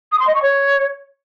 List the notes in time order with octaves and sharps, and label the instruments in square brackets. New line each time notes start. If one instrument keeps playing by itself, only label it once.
[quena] D#6
C6
D#5
C#6
C#5